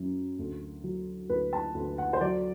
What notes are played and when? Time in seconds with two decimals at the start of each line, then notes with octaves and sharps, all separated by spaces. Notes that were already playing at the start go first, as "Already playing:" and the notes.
Already playing: F#2 F#3
0.39 D2
0.84 F#3
1.29 D2 B4
1.53 A5
1.74 D2
1.98 F#5
2.13 C5
2.21 F#3 D5